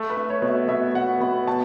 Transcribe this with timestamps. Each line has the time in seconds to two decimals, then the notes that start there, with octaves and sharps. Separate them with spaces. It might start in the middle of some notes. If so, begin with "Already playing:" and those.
Already playing: A3 A4
0.10 B4
0.17 A3
0.30 C#5
0.42 B2
0.49 E5
0.68 B2 E5
0.94 B2 F#5
1.20 B2 B5
1.47 B2 A5